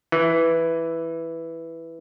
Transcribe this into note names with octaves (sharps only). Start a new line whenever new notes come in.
E3